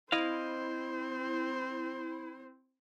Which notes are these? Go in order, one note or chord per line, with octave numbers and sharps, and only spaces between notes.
C4 E4 C5 D#5 F5